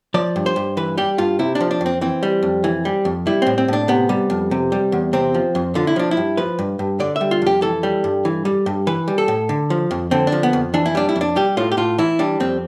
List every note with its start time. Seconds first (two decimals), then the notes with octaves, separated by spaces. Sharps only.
0.14 F3 D5
0.36 G2
0.46 C5
0.56 G2
0.77 E3 B4
0.98 G3 G4
1.18 G2 F4
1.39 C3 E4
1.55 D4
1.61 F3
1.71 D4
1.81 F2
1.86 C4
2.01 E3 C4
2.23 G3
2.43 F2
2.64 E3
2.85 G3
3.05 F2
3.27 G3 E4
3.42 A2 C4
3.58 C4
3.68 A2 D4
3.88 C3 B3
4.09 G3
4.30 F2
4.51 C3
4.72 G3
4.92 E2
5.13 C3 C4
5.34 F3
5.55 F2
5.75 D3 F4
5.87 E4
5.96 F3 D4
6.11 E4
6.17 G2
6.37 F3 B4
6.59 G2
6.79 G2
7.00 D3 D5
7.16 E5
7.21 G3
7.31 F4
7.42 F2 G4
7.62 E3 A4
7.83 G3
8.04 G2
8.25 E3
8.45 G3
8.66 G2
8.87 E3 B4
9.08 G3
9.18 A4
9.28 A2
9.49 D3
9.70 F3
9.91 F2
10.11 D3 C4
10.27 D4
10.32 F3
10.43 B3
10.53 F2
10.74 E3 D4
10.86 E4
10.95 G3 D4
11.09 E4
11.16 F2
11.21 D4
11.36 G3 G4
11.57 A2 F4
11.72 G4
11.77 A2 F4
11.98 E3 E4
12.19 G3 D4
12.40 F2 C4